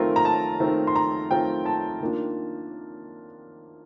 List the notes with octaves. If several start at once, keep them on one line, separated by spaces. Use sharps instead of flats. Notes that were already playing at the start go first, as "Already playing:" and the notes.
Already playing: D#3 A3 C4 F4 A#4
A#5
A5
D#3 A3 C4 F4
C6
A#5
D#3 A3 C4 F4 G5
A5
D#3 A#3 D4 F4